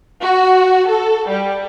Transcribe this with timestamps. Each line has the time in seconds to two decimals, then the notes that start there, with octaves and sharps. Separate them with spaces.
0.21 F#4
0.88 A4
1.29 G3